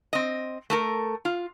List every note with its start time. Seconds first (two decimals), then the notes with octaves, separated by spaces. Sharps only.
0.13 C4 D#5
0.70 A3 A4 A#4
1.25 F4